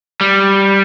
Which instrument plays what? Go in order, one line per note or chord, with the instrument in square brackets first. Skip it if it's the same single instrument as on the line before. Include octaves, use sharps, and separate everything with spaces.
[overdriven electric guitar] G3